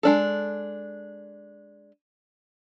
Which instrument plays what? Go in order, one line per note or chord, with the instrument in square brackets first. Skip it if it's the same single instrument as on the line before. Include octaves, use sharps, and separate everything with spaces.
[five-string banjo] G#3 D4 A4